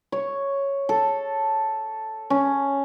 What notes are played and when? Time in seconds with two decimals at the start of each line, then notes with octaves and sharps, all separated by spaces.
0.12 C#5
0.89 A4
2.30 C#4